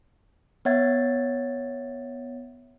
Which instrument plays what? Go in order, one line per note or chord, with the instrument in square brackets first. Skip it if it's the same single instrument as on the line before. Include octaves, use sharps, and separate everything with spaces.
[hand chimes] B3 C#5 E5 F#5 G#6 A6